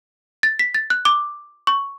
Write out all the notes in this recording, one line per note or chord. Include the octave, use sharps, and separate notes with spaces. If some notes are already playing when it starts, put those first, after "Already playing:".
A6
B6
A6
F#6
D6
C#6